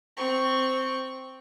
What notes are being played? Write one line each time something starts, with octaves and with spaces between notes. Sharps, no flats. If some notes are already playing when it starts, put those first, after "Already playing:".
C4 C#6